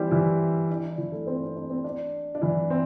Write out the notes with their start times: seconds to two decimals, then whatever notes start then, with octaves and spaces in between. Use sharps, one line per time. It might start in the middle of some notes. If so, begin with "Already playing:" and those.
Already playing: E3 G3 C4 E4 G4 C5
0.11 E3 E4
0.70 D4
0.83 D4
0.98 E3 E4
1.12 A3 A4
1.27 C4 C5
1.42 D4
1.56 D4
1.70 C4
1.84 D4
2.35 D4
2.42 E3 E4
2.70 C4